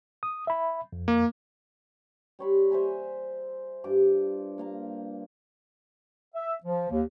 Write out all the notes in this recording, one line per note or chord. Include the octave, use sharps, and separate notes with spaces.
D#6
E5 B5
F2
A#3
G3 C#5 B5 C6
C5 E5 G#5 A#5
G2 F4 D6
A#3 F5 A#5
E5
F3
D#2